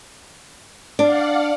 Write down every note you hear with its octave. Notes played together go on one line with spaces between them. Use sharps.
D4 D5 F5 F#5